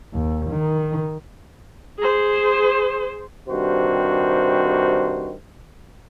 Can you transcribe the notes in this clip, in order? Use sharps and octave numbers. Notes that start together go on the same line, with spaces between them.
D#2
D#3
G#4 C5
G2 C3 D#3 F#4 C5